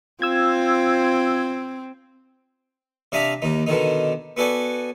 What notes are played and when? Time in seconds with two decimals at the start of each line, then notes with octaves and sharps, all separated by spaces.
0.22 C4 F4 E6 G#6
3.12 C3 D4 F5 A#5 B5 D#6
3.42 D#2 D#4
3.66 B2 D3 D#3 D#4
4.37 B3 F#4 A4 D5 G#5